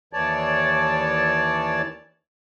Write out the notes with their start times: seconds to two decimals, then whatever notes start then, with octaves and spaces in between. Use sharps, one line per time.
0.13 D#2 E3 C#5 D5 A5